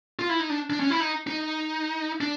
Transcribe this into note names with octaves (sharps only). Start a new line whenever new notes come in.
F4
E4
D#4
D4
D4
C#4
E4
D#4
D#4
D4